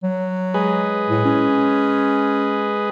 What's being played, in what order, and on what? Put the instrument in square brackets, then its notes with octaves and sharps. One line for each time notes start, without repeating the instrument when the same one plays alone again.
[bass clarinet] F#3
[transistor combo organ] G#3 G#4 B4
[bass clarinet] A2
C#4